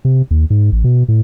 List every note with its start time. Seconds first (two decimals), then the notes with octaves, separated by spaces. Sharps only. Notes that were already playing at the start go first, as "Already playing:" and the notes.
0.05 C3
0.31 D#2
0.50 G#2
0.72 A1
0.84 B2
1.08 A2